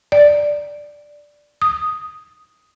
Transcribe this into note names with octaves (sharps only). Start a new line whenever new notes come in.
D5
D#6